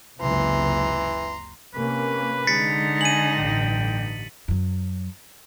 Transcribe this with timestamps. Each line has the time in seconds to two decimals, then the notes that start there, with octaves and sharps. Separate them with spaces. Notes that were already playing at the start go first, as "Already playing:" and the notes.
0.21 F#1 C#2 C3 E3 A#5 C6
1.74 C3 A#3 C#4 B4
2.47 D3 G#3 D#4 A6 B6 C#7
3.01 G#5 D#7 F#7
3.38 A1 G2 G5
4.48 F#2 F#3